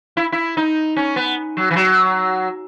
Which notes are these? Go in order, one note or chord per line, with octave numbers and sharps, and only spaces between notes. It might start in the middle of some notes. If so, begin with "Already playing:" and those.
E4
E4
D#4
C#4
B3
F#3
E3
F#3